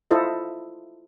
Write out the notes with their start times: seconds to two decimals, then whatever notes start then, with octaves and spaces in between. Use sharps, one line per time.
0.11 E4 F4 A4 C5 D#5